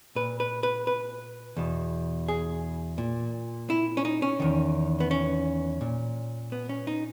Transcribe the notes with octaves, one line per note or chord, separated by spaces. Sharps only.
A#2 B4
B4
B4
B4
E2 B2
G#4
A#2
E4
C#4
D#4
C#4
E2 D#3
B3
C#4
A#2
B3
C#4
D#4